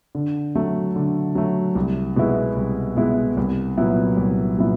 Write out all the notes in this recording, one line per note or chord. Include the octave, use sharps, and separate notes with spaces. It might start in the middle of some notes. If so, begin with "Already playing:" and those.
D3
F#3 A3
D3
F#3 A3
C2
B2 G#3 B3 E4
C2
B2 G#3 B3 E4
C2
A#2 F#3 B3 E4
C2
A#2 F#3 B3 E4